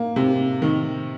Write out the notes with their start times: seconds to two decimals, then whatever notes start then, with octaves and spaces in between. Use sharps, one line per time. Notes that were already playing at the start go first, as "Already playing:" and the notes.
Already playing: A#3
0.16 C3
0.62 D#3